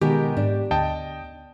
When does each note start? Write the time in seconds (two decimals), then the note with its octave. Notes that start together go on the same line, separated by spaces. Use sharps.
0.01 B2 D#3 G#3 G4 A#4
0.37 G#2 D4
0.71 D2 D#5 G5 A5